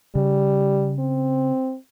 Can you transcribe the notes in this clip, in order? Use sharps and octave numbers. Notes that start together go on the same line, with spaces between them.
C#3 G3
C4